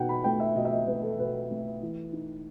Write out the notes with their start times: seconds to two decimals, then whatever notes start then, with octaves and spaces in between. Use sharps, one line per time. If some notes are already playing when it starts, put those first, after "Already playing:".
Already playing: B2 D#4 F#5 G5
0.09 B5
0.24 A3 G5
0.40 E5
0.55 B2 D#5
0.65 E5
0.72 D#5
0.87 A3 B4
1.02 A4
1.19 B2 B4
1.51 A3
1.82 E3
2.13 D#4